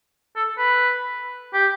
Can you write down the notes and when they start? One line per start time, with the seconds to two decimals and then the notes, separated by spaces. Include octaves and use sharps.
0.36 A4
0.58 B4
1.54 G4